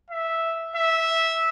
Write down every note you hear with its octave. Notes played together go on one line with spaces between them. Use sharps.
E5
E5